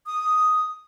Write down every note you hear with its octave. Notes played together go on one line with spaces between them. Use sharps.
D#6